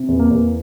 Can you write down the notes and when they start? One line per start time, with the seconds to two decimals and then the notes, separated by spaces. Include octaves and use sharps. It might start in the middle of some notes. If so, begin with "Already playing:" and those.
Already playing: C3
0.08 E2
0.19 A#3
0.31 E2